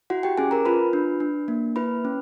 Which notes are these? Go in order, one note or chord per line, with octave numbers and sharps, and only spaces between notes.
E4 F#4 F#5
G4 G5
C#4 G#4 G#5
A#4 A#5
F4 B4 B5
D4
D4
A#3
E4 B4 B5
C#4